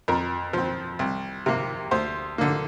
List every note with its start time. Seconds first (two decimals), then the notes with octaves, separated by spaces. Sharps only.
0.08 F2 A#4
0.53 F3 C4
0.99 C2
1.46 C3 A#3
1.91 D2 C5
2.38 D3 A#3